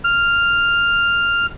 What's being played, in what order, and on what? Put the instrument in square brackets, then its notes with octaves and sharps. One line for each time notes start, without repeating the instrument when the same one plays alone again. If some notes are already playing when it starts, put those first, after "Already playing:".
[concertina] F6